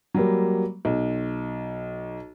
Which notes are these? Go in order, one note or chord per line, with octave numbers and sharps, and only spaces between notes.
F#3 G3 A#3
B1